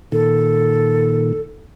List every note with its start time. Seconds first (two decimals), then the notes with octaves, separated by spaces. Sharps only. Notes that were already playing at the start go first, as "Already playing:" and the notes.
0.12 A#2 D#3 A4